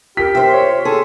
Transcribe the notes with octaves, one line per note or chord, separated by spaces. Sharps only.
F4 G4 A#4 F6 B6
C5 E5 G5 C6 F6
C#5
G#4 A4 C6